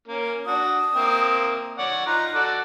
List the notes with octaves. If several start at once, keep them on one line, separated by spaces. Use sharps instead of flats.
A#3 C#4
D4 F#4 D#6
A#3 C4 E5
C#5 D5 F#5
D#4 F4 A#5 F#6
F#4 A4 D5